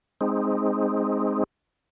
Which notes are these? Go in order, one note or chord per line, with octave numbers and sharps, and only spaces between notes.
G#3 C4 D#4